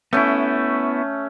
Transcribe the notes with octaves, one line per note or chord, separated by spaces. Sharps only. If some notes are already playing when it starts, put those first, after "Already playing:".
A3 B3 C#4 E4